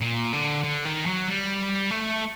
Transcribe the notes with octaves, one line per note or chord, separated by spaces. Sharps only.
A#2
D3
D3
D#3
F#3
G3
A3